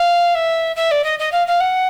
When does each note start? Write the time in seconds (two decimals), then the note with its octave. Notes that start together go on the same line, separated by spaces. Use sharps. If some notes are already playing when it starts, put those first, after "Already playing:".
Already playing: F5
0.34 E5
0.75 E5
0.91 D5
1.04 D#5
1.19 D#5
1.32 F5
1.47 F5
1.60 F#5